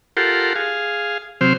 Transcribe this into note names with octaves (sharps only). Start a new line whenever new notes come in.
F4 G4 A4 A#4 F#5 C6
G#4 F5
C3 F#3 C4 C5 F6